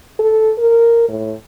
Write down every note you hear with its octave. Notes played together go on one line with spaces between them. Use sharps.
A4
A#4
A2